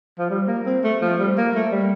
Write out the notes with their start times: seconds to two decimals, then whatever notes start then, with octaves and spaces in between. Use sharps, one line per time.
0.19 F3
0.30 G3
0.47 A#3
0.66 C4
0.84 A3
1.01 F3
1.20 G3
1.37 A#3
1.55 A3
1.72 G3